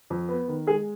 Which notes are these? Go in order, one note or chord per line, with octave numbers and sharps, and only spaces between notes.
F2
B3
D#3
G#3 G#4